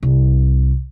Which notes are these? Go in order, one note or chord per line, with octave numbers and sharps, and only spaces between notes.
C2